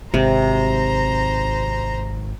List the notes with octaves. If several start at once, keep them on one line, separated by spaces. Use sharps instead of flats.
G#1 C3 C5 A#5